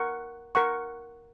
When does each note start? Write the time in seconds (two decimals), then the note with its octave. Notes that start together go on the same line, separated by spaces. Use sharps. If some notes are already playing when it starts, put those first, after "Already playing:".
Already playing: A#4 F#5 C#6
0.55 A#4 F#5 C#6